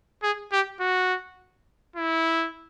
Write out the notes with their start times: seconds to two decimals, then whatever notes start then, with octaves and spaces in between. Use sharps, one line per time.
0.23 G#4
0.52 G4
0.80 F#4
1.96 E4